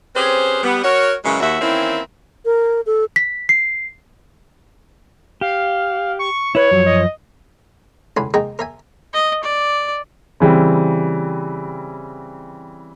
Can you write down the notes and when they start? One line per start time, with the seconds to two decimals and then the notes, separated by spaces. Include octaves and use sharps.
0.16 C4 C#4 G4 G#4 B4 C5
0.63 G3 B3
0.83 F#4 A#4 C#5
1.24 F#2 C#3 E3 F#3 G#3 C#4
1.40 D#2 F#4 E5
1.61 D#3 E3 A#3 C4 C#4 E4
2.45 A#4
2.86 A4
3.16 B6
3.49 C7
5.41 G4 F5
6.19 C#6
6.55 E4 B4 C#5
6.71 F#2 F3 F#3
6.86 D#5
8.17 C#2 D3 E4 G#5 C6
8.34 G#3 D#4 G#4 A#4 G5
8.59 A#4 E5 G#5
9.13 D#5
9.43 D5
10.40 C#3 E3 G3 C4